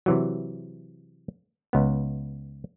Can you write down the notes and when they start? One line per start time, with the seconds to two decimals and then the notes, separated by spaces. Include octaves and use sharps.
0.06 C3 E3 F#3
1.73 C#2 B3